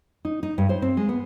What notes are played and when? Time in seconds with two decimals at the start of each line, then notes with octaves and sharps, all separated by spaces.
0.25 D#4
0.43 D#4
0.58 G2
0.69 C5
0.82 C4
0.97 G#3
1.09 B3